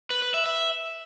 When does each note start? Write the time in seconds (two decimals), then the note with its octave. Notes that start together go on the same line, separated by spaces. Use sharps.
0.10 B4
0.22 B4
0.34 E5
0.46 E5